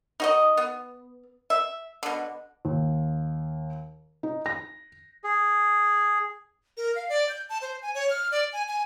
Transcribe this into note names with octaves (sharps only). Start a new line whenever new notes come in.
D#4 F#4 D#5
B3
E5
B2 D3
D#2
D#4
A#6
G#4
A#4
F5
D5
G6
A5
C5
G#5
C#5
F6
D5
G#5
G#5